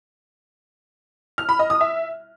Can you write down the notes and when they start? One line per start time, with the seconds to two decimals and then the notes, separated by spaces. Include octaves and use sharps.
1.38 F6
1.49 B5
1.59 D#5
1.70 D#6
1.81 E5